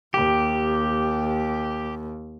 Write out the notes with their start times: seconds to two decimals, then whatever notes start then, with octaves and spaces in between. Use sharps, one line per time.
0.14 D#2 G4